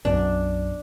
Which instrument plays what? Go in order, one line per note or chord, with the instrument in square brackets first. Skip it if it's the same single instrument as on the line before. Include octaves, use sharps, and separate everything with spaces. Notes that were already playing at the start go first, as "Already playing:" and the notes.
[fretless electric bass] B1 F#2 B2 [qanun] D4